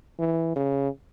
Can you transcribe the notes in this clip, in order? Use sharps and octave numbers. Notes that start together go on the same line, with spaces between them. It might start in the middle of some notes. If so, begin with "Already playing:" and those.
E3
C#3